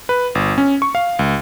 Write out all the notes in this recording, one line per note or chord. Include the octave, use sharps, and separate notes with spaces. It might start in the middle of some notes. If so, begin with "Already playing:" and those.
B4
G1
C#4
C#6
F5
C#2